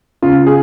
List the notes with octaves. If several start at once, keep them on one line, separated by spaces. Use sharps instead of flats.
C#3 F4
G#4